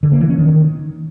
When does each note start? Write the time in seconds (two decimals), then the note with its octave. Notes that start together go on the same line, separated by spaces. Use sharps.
0.03 D3
0.12 A#3
0.21 E3
0.30 C#4
0.38 D#3